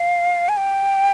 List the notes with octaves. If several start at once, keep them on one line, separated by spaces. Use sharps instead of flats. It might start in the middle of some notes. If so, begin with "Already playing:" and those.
Already playing: F5
G#5
G5